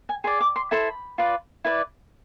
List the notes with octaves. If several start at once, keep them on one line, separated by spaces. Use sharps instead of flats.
G#5
G#4 D5 C6
D6
C6
E4 A4 C5 B5
F4 B4 D5
E4 B4 D5